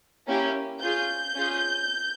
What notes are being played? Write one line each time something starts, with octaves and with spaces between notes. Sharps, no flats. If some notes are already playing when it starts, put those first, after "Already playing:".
A#3 C#4 E4 G4
C#4 F4 G#4 G6
C#4 F4 G#4